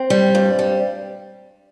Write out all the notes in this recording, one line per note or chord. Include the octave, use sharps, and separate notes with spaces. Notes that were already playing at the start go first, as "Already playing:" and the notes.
Already playing: C4
G3
G2
G3